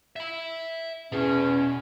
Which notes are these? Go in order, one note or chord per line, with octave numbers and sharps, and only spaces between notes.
E5 B5
E2 B2 C#4